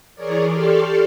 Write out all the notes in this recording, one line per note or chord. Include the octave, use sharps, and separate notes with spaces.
E3 G#4 A#4 C#5 D5
G4 A4 D5 C6 C#6 F6